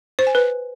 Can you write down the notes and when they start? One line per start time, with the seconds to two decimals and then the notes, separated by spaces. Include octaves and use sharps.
0.19 C5
0.27 G#5
0.35 B4